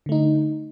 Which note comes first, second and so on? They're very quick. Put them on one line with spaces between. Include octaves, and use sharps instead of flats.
D3 A3 D#4